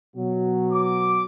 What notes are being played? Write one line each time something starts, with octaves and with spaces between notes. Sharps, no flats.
B2 F#3 F#4
D6